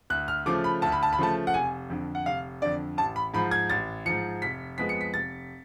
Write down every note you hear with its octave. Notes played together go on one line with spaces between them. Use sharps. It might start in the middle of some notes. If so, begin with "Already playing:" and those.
D2 F#6
F6
C#3 F3 A3 D6
B5
D2 A5
B5
A5
B5
C#3 F3 A3 A5
F#5
F1 G#5
F2 D3
F#5
F1 F5
F2 D3 D5
A1 A5
B5
G#2 F3 B5
G#6
A1 A6
G#2 F3 C#7
F1 B6
F2 F3 G#3 B3 B6
C#7
B6
F1 A6